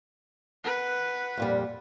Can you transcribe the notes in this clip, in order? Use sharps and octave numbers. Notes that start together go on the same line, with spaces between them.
B4 F#5
F2 A#2 G3